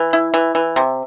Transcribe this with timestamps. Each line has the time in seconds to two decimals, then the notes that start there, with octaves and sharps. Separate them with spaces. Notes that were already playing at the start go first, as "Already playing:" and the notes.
Already playing: E3
0.13 E4
0.34 E3
0.55 E3
0.76 C3